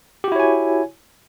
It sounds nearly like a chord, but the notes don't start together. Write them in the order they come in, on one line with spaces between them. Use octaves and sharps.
G4 F#4 E4 C#5 G#5